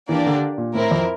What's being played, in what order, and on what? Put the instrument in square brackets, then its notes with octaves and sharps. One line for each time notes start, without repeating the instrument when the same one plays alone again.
[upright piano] E3 [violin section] A#3 D4 G4 D5
[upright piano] D3
A#2
[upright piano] A2 [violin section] C4 E4 A#4
[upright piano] F2